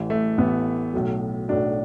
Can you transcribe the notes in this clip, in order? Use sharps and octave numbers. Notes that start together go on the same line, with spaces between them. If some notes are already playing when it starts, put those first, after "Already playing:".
Already playing: A1 A2 E3
A3
A1 A2 E3 B3
B1 A2 F#3
B1 A2 F#3 D4